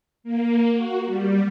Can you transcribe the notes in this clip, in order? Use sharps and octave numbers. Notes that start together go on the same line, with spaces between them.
A#3
F#4
G3